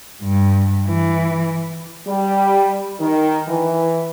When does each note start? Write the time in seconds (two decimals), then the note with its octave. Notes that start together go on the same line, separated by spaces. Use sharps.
0.23 G2
0.87 E3
2.06 G3
2.99 D#3
3.46 E3